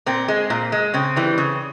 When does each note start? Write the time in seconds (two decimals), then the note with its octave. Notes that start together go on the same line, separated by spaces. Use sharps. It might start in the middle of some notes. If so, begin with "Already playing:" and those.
0.06 A#2 C4
0.28 G#3
0.50 A#2
0.72 G#3
0.94 C#3 C4
1.16 E3 G3
1.38 C#3